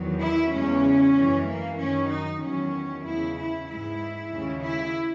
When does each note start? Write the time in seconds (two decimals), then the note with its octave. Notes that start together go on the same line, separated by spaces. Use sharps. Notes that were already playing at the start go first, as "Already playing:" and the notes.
Already playing: E2 D#3 F#3
0.22 E4
0.53 E2 C#3 E3 G#3 C#4
1.16 F#2 E3 G#3
1.48 A#3
1.79 F#2 D#3 F#3 C#4
2.11 D#4
2.42 E2 D#3 F#3 C#4
3.06 E2 C#3 G#3 E4
3.38 E4
3.68 G#2 E3 G#3 E4
4.32 D#2 C#3 G#3
4.63 E4